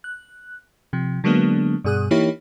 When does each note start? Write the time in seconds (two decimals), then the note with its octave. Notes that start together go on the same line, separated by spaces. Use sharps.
0.04 F#6
0.93 C3 F3
1.24 D3 F#3 G#3 A#3 B3 D4
1.84 G2 B2 G#4 D#6 F#6
2.11 E3 A#3 D#4 E4 G4 C#5